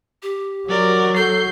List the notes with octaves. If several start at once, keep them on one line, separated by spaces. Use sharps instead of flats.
G4
F#3 A#4 D5
A4 G6 C7